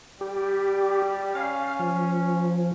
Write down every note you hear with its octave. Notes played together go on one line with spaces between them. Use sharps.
G3 G4
C#4 F5
F3